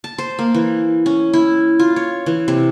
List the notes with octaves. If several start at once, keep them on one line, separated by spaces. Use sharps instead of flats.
A5
C5
A#3
E3
C#4
E4
F4
C#5
E3
C3